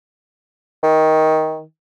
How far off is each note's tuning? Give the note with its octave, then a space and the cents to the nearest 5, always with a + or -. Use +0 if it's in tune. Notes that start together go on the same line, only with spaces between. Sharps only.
D#3 +15